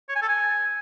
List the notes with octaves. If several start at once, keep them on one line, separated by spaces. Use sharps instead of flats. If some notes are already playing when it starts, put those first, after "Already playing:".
C#5
G#5
A4
G#5